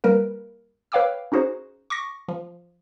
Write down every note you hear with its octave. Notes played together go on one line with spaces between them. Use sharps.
G3 A#3 A#4 B4
B4 C#5 F5 G5 D6 E6
C#4 D#4 F#4 G#4 C5
C#6 D6 A#6
F3